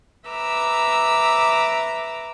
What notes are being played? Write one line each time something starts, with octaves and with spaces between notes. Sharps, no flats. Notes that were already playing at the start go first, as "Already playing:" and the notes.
B4 E5 A#5 D6 E6